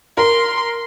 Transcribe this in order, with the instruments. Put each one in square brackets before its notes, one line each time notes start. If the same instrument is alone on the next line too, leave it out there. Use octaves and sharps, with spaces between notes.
[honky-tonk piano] A#4 [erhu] C6